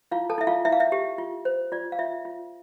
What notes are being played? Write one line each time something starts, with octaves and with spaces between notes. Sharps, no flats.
E4 F4 F5
A4 A5
E4 E5
F4 F5
E4 E5
F5
E5
G4
F4
C5
F4 D5
F5
F4 E5
F4